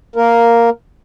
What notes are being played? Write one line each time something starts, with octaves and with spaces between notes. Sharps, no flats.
A#3 A#4